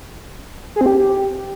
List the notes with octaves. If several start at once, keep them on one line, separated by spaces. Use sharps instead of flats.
G#4
C4
G4